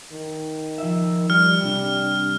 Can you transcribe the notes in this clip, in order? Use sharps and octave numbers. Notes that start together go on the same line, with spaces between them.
D#3
F3 E5
G3 F6
C2 D4